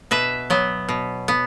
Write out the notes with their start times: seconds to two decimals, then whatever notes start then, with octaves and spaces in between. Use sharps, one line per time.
0.11 B2 B4 E5
0.50 F#3 B3
0.89 B2
1.28 B3